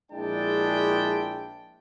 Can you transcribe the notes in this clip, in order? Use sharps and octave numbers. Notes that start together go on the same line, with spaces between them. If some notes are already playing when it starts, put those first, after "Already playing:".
A#1 G#3 D4 E4 G5 A5